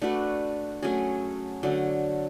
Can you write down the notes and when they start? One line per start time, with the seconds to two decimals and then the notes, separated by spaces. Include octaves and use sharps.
0.02 A3 D4 F#4 B4
0.83 F#3 A3 C#4 G#4
1.63 D3 F#3 A3